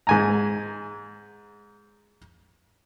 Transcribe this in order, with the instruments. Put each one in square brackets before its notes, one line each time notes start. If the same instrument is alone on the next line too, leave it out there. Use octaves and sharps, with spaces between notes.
[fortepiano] G#2 G#5 A#5